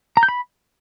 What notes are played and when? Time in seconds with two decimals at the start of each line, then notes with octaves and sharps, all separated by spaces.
0.17 A#5
0.23 G6
0.29 B5